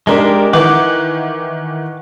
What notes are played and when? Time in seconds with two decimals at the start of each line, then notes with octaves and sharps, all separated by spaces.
0.07 G#3 D4 D#4 G4 A#4
0.53 D#3 E3 F#5 D6